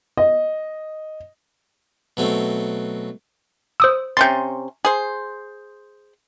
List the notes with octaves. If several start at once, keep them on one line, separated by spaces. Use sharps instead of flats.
D#5
B2 F#3 A3 C4
C5 D#6 E6
C3 C#4 C6 G6 A6
G#4 C5